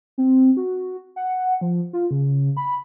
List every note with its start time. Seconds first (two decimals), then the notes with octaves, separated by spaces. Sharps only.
0.18 C4
0.57 F#4
1.16 F#5
1.61 F3
1.93 F4
2.11 C#3
2.57 B5